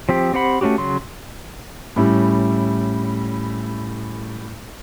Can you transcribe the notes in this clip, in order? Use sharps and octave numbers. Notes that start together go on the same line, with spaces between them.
F3 C4 G4
C4 G4 C5 F#5 B5
A3 A#3 C#4 F#4 G4
C#3 F#3 C6
A2 G3 C#4 E4